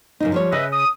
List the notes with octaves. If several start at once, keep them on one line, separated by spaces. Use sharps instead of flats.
F#2 C#3 D#4
F3 G3 C#5
C#3 B4 D#5 E5
D#6